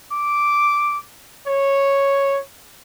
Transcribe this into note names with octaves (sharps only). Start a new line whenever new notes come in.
D6
C#5